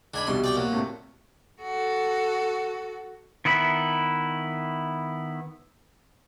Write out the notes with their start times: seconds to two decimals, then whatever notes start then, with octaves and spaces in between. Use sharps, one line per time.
0.14 C#2 D4 G#5 B5
0.27 C2 B2 G3 C6
0.44 D5 G5 D6
0.56 A#2 F#3
0.72 A2 C3 A3
1.62 F#4 A4
3.45 D#3 B3 E4 B5